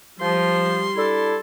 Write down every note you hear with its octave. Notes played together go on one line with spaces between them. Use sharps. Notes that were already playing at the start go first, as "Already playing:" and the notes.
F3 G3 C6
D4 E4 A4